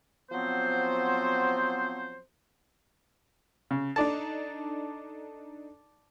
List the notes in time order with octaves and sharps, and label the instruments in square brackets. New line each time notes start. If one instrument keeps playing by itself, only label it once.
[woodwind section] F3 F#3 B3 C4 C5
[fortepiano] C#3
[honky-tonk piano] D4 D#4 A4 [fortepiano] D5 A5